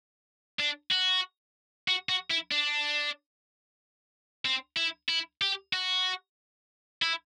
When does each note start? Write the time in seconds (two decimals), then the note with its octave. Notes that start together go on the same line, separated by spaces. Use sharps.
0.59 D4
0.91 F#4
1.88 F#4
2.09 F#4
2.30 E4
2.52 D4
4.45 C4
4.77 E4
5.09 E4
5.41 G4
5.73 F#4
7.02 E4